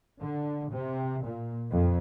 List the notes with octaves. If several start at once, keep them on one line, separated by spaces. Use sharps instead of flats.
D3
C3
A#2
F2